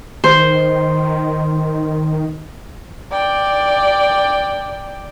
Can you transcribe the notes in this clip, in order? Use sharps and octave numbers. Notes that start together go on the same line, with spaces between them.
D#3 C5
D5 G5